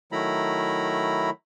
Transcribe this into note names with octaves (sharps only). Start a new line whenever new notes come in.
D#3 F#3 A3 E4 A#5 B5